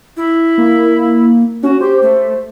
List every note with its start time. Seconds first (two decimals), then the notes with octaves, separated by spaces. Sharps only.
0.17 E4
0.58 A#3
1.63 C#4 F#4
1.81 G4 C5
2.02 A3